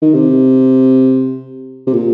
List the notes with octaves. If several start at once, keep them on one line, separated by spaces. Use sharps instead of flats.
D#3
C3
C3
A#2